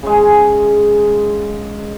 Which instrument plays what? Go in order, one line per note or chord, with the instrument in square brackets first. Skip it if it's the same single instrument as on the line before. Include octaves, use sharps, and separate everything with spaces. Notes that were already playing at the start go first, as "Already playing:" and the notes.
[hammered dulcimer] C#3 G#3